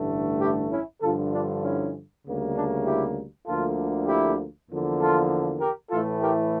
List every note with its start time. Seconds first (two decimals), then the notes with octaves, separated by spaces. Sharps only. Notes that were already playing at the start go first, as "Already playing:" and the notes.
Already playing: A1 G2 D3 A3
0.40 E4 G4
0.71 C#4 E4
1.02 G2 D3 F3 F4 A4
1.32 D4 F4
1.63 C#4 E4
2.25 D2 C#3 G3 A#3
2.55 D4
2.86 E4 G4
3.46 D2 D3 F3 A#3 F4 A4
4.07 E4 G4
4.69 E2 D3 F3 A#3
5.00 F4 A4
5.61 G4 A#4
5.91 A2 E3 A3 F4 A4
6.22 G4 A#4